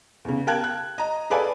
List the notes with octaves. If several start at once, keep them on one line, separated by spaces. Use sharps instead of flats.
E2 C#3
A#4 F5 G5 A5 F#6 G#6
F#6
D#5 A#5
G#4 A4 B4 D5 F5 G#5